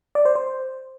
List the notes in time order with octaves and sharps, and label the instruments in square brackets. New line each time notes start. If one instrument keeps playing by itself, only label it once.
[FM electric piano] D5
C5
C5